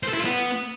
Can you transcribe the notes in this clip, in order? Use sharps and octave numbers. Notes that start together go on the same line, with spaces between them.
C5
A4
E4
F4
B3